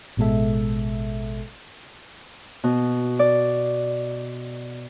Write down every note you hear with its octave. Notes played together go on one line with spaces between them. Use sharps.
A1 B2 G#3 A4 E5
B2
D5